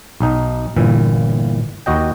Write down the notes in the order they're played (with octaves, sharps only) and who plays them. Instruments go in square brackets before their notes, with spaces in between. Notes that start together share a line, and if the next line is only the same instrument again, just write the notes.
[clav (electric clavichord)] B1 D#4
G1 A#2 E3 E5
D#2 F#4 D#5 G5